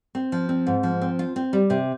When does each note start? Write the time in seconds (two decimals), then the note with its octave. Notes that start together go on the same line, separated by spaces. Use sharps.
0.15 C4
0.32 F3
0.49 C4
0.67 G#2
0.83 F3
1.01 C4
1.19 F4
1.36 C4
1.53 G3
1.70 C3